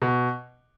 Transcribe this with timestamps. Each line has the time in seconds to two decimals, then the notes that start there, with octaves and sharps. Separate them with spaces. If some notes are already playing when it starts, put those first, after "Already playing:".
0.02 B2